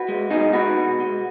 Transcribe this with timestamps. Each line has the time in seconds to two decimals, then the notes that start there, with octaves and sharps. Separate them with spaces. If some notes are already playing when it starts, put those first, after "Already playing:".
Already playing: F#4 B4
0.08 G#3
0.31 B2 D#4 G#4
0.53 G#3 F#4 B4
0.77 B2
1.00 G#3